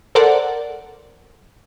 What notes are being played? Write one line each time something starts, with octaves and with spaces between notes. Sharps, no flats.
A4 A#4 C5 D5 F#5